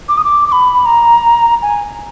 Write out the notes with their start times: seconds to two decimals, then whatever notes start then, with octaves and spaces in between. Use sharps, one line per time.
0.09 D6
0.17 D#6
0.24 D6
0.47 D6
0.52 B5
0.86 A#5
1.62 G#5